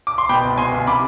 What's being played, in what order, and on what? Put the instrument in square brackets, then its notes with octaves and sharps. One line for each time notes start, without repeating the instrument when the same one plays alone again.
[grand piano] D6
C6
B2 G5 B5
C2
B2 G#5 C6
C2
C3 B5 D6